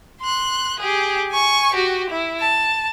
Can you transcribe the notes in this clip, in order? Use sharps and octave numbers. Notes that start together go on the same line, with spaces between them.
C6 F#6
G4 G#4
G#5 C#6
F#4 G4
E4
A5